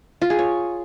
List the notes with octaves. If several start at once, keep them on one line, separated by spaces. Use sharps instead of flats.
F4
G#4
C#5